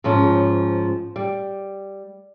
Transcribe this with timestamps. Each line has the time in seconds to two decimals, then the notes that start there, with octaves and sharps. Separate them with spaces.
0.04 G#2 F3 C#4
1.16 G3